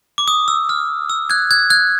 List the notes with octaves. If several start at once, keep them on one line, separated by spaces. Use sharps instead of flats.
D6
D#6
E6
F6
E6
F#6 G#6
F#6 G#6
F#6 G#6